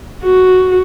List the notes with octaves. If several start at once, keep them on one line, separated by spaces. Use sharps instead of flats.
F#4